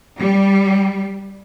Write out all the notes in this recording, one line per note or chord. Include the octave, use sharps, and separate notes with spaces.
G3